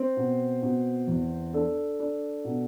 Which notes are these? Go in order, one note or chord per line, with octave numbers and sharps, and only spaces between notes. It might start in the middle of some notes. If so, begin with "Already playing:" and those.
Already playing: C4 C5
B2
B2
E2
D4 A4
D4
B2